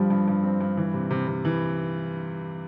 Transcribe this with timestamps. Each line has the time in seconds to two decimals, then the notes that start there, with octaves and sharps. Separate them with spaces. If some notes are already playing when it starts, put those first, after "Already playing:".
Already playing: G2 F3 G3
0.10 G2
0.28 G2
0.43 C4
0.61 G2
0.77 E3
0.94 C3
1.10 C3
1.28 C3
1.45 E3